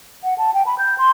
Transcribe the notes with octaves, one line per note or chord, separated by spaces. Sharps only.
F#5
A5
G5
B5
G6
C6